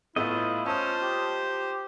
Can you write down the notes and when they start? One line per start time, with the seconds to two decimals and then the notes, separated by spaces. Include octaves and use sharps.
0.16 A2 A3 B3 E4 F4 D#5
0.66 C#4 C5 A5 D#6
1.02 G4